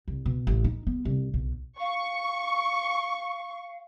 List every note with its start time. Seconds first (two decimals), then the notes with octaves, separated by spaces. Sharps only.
0.08 C2
0.26 B2
0.47 A1
0.64 D#4
0.87 B3
1.05 C2
1.34 B1
1.80 F5 C#6